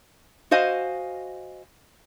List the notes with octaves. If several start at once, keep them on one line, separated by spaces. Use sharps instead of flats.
F#4 C5 D#5 F5 G#5